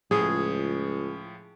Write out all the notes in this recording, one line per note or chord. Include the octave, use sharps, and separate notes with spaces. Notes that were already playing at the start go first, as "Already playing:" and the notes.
C#2 A2 F3 G#4